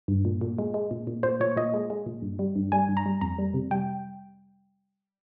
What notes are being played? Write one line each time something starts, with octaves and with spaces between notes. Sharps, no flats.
G2
A#2
A#2
G#3
G#3
A#2
A#2
A#2 C5
A#2 C#5
A#2 D#5
G#3
G#3
A#2
G2
G3
G2
G3 G#5
G2
A#5
G3
F2 A#5
G3
C3
G3 G5